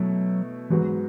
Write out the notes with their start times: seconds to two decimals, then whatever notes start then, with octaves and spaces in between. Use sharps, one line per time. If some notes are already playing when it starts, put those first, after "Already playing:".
Already playing: B2 F#3 A3 E4
0.70 G#2 E3 F#3 B3 F#4